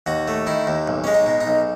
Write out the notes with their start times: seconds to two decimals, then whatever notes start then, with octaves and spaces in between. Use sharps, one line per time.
0.06 D#2 F#4
0.28 A3
0.47 D#3 E4
0.67 D#2
0.88 B1
1.04 G#3 C#4
1.14 D#4
1.26 B2
1.41 D#4
1.47 B1